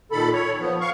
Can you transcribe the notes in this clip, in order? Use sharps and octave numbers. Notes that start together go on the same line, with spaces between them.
A#2 D#3 A4 B5
C#5
F3 B3
F5 C#6